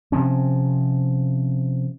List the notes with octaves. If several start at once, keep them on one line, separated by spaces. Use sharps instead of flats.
C3 F3 C4 C#4